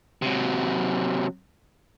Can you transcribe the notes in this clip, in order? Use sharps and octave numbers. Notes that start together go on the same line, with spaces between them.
C3 F#3